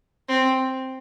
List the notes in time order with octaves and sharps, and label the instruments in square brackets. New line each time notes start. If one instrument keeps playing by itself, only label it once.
[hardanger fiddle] C4